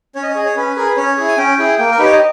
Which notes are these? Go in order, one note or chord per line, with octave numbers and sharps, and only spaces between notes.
C#4 C#5
D#5
C#5
G#4 D#5
C#5
C#4 B4
G#4 A#4
B4
C#4 C#5
E4 G#4
G#5
C#4 G5
E4 G#4
A#3 G5
A#4
D#4 G4 B4
C#5
D#5